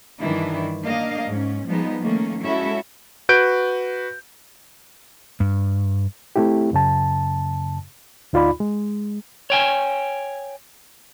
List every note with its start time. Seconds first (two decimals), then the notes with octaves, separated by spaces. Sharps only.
0.20 G2 D#3 E3 D4 E4
0.82 A#3 D4 D#5 F5
1.26 G#2 C#4
1.66 F3 G3 G#3 B3 D#4
2.02 D#3 A3 A#3 C#4
2.42 G#3 C#4 E4 F#4 A4 E5
3.29 F#4 B4 G6 D7
5.40 G2
6.36 A3 C4 E4 G4
6.73 F#2 C#3 A5
8.33 D2 D#4 F4 D5 B5
8.60 G#3
9.50 C#5 G5 G#5